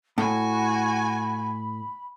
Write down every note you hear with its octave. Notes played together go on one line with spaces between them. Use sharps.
A2 F#4 G#5 B5